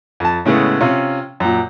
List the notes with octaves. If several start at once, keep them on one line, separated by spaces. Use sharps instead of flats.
F2 A5
A2 C#3 G#3 A3 B3
C3 C#4 F4
F#2 A#2